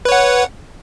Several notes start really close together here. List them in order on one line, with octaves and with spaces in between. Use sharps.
B4 C#5 F#5